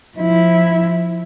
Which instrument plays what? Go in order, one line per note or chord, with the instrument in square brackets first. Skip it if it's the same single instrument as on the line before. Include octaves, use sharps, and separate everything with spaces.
[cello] F3 E4